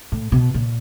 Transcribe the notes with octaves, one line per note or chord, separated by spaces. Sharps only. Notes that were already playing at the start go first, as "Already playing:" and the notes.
A2
B2
A#2